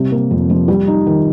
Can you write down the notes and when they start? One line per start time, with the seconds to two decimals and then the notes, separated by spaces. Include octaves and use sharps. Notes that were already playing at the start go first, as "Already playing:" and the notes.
Already playing: C3 G3
0.11 A#3
0.31 F2
0.50 F3
0.68 G3
0.87 D#4
1.06 D#3